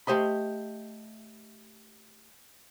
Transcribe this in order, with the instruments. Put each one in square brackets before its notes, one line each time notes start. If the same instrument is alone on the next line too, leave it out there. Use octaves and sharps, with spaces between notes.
[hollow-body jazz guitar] A3 G4 C5 D#5 B5